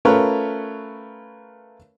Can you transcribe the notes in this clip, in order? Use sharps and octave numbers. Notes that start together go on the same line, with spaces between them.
A3 C#4 F4 A#4 B4 C#5